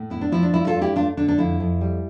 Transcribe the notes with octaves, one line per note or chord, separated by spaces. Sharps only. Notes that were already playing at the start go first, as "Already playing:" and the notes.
Already playing: A2
B3 E4
D4
F3 E4
D4
G2 E4
F4 A4
G2
E4 G4
A3 D4 F4
D3 D4
D4
F2 E4
F2
G3